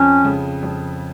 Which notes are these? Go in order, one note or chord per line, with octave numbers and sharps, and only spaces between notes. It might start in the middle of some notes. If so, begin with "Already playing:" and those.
Already playing: F2 C#4
C#3
F2